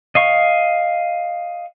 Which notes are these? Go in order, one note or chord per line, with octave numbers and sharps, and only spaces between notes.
D#5 F5 C#6